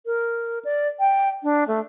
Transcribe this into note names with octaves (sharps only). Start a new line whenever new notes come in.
A#4
D5
G5
D4
A3